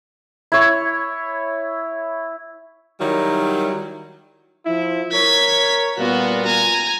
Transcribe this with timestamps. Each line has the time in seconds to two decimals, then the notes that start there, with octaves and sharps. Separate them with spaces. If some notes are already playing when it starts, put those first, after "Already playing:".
0.52 E4 C#5
2.98 D#3 F#3 G3 E4
4.66 F3 E4
5.12 A#4 C#5 G#6 B6
5.97 A#2 G3 B3 F4 F#4
6.45 G#5 A#5